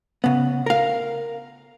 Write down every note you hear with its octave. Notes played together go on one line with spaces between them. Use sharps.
C#3 B3
A#4 F5